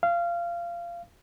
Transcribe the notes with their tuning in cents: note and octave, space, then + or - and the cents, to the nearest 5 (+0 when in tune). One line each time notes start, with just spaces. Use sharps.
F5 -20